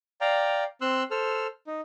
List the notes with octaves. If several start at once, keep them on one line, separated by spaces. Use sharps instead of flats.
D5 F5 G5 A#5
C4 C6 E6 F#6
A4 C5 E6 F6
D#4